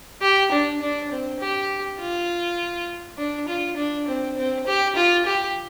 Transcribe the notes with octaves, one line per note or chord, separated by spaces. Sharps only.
G4
D4
D4
C4
G4
F4
D4
F4
D4
C4
C4
G4
F4
G4